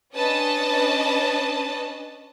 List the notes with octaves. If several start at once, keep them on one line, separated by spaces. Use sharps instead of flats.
C#4 D4 B4 D#5 A5